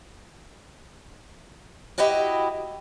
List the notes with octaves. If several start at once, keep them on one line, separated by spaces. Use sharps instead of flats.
E4 F#4 G4 B4 D#5